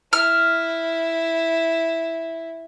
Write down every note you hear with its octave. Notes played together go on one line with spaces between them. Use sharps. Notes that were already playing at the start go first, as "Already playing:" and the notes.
E4 F6